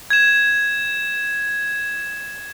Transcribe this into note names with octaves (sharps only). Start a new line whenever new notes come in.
G#6 E7